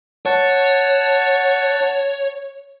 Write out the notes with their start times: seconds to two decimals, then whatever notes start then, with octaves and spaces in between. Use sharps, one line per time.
0.26 C#5 F#5 A5